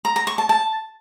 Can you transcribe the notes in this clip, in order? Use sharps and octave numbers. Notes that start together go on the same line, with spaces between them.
A#5
A#5
C#6
A5
A5